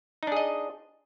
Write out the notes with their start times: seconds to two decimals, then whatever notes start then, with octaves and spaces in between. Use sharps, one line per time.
0.23 D#4
0.27 D4
0.32 G#4
0.37 D#5